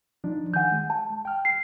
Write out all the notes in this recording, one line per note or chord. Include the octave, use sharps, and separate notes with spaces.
F3 D4 D#4
D#3 F#5 G#5 G6
G#3
A5
G5 F6
C7